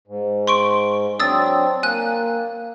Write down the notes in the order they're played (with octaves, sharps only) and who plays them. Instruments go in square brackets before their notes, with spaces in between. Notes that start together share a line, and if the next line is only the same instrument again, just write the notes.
[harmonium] G#2
[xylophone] C6 C#6 D7
[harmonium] F#3 C4 D4 [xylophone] D#6 E6 A6
[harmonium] A#3 [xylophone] G#5 F#6